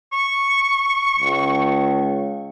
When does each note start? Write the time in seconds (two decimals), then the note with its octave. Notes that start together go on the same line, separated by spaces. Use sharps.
0.13 C#6
1.20 C#2